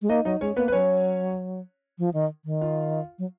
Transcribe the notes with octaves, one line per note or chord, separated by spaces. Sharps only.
G#3
A#3 D#4 D#5
F#3 D#4 D#5
G#3 C#4 C#5
A#3 B3 B4
B4
F#3 C#4 C#5
F3
D#3
D#3
F4 F5
F#3